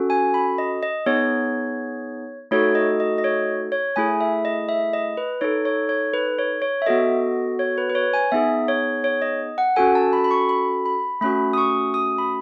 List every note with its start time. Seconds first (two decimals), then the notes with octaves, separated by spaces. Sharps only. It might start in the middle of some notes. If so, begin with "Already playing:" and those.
Already playing: C#4 F#4 A4
0.10 G#5
0.34 B5
0.58 D#5
0.83 D#5
1.06 B3 D#4 G#4 C#5
2.51 A3 D#4 F#4 A4 C#5
2.75 D#5
3.00 D#5
3.18 D#5
3.24 C#5
3.72 C#5
3.96 A3 E4 G#4 G#5
4.21 E5
4.45 D#5
4.69 E5
4.93 D#5
5.17 B4
5.41 D#4 A4 C#5
5.65 C#5
5.89 C#5
6.14 B4
6.39 C#5
6.62 C#5
6.82 E5
6.86 B3 F#4 A4 D#5
7.59 C#5
7.78 B4
7.90 B4
7.95 C#5
8.13 G#5
8.32 B3 D#4 G#4 E5
8.68 C#5
9.04 C#5
9.22 D#5
9.58 F#5
9.76 C#4 F#4 A4 G#5
9.95 A5
10.13 B5
10.24 B5
10.31 C#6
10.49 B5
10.85 B5
11.21 A3 C#4 F#4 B5
11.53 D#6
11.58 C#6
11.94 D#6
12.18 B5